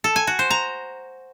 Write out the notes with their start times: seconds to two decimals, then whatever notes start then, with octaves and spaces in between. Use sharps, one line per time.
0.04 A4
0.16 G#5
0.27 F#4
0.39 C5
0.50 A#5